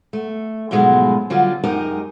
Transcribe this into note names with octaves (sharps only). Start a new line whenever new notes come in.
A3
G#2 B2 F3 F#3 G#3 A3
D3 F#3 G3 F4
F#2 G#3 D#4 G4 A#4 D#5